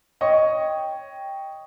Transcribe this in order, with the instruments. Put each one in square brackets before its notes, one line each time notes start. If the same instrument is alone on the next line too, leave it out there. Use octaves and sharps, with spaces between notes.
[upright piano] C#5 D#5 G5 C#6